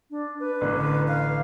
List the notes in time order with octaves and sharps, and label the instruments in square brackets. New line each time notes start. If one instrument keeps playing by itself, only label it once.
[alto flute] D4
B4
[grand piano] A1 D3 D4
[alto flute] B4
F5